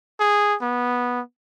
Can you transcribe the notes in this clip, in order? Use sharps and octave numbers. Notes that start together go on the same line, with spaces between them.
G#4
B3